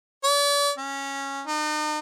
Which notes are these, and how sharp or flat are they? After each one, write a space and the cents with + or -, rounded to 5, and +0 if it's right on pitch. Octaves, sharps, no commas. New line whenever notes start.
D5 -45
C#4 -10
D#4 -40